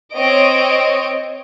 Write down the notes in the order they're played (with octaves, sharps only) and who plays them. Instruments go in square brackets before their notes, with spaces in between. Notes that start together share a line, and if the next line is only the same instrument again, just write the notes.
[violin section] C4 C#5 D#5 D7